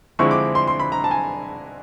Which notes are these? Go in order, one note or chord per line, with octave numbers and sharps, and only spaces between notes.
D3 F3 G#3 C4 E4 C#6
D6
C6
C6
B5
A#5
A5
G#5